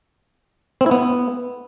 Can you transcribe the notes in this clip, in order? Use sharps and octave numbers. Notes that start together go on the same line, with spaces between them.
C4
E4
B3